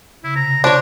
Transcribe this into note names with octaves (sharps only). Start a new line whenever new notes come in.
C#3 E4
C3 A#5
D4 C5 C#5 D6